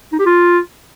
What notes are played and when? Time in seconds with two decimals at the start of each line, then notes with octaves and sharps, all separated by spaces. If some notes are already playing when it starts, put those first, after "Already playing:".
0.12 D#4
0.19 G4
0.26 F4